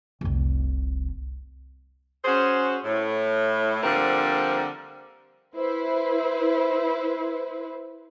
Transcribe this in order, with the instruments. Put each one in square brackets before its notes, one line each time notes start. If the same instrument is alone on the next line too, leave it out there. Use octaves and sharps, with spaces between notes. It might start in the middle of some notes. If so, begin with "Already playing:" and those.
[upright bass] F1 C2
[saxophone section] C#4 F#4 G#4 C5
A2
D3 F3 G3 A#3 C4
[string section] E4 B4 C5